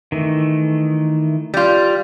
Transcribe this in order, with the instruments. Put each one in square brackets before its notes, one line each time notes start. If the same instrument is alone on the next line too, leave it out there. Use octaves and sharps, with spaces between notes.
[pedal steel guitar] D#3 E3 A3
[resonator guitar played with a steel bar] G3 F4